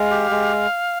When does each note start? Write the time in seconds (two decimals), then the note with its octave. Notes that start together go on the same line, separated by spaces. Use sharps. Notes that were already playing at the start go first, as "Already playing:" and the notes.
Already playing: G#3 F5
0.11 G4
0.31 G#3